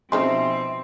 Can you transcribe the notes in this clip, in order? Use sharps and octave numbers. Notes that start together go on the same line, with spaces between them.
B2 F3 C4 C#4 D#4 G#4 E5 C6